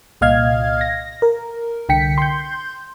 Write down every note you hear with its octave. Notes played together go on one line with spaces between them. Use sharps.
C2 A#2 D#5 F5 F6 G#6
A#6
A#4
C2 D3 G5 B6 C#7
C6 G6